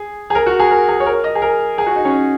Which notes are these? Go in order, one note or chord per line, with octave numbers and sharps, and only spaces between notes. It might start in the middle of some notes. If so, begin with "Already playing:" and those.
Already playing: G#4
G#4
A#4
F#4
G#4
A#4
G#4
C#5
A#4
D#5
G#4
A#4
G#4
F#4
D#4
C#4